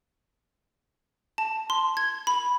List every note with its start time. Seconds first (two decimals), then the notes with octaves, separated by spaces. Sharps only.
1.38 A5
1.70 C6
1.97 G#6
2.27 B5